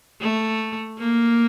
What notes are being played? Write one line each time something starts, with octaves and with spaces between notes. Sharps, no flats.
A3
A#3